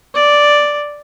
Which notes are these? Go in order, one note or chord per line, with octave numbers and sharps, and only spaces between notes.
D5